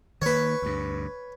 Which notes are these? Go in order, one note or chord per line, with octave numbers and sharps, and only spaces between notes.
D#3 A#3 B4 C#5
D2 G2